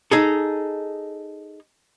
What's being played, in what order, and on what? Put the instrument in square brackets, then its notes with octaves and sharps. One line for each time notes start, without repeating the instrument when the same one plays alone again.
[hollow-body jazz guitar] D#4 G#4 A4